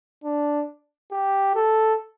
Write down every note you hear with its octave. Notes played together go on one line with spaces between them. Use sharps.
D4
G4
A4